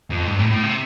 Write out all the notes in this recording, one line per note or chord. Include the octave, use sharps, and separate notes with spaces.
F2
G2
A2
A2
C3